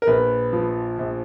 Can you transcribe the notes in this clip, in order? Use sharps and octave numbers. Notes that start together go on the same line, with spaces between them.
A#4
A#1 B4
F3
A#1